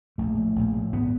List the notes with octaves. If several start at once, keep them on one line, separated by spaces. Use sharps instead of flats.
A#1 A3
A2
A#1
A2
G#1 B3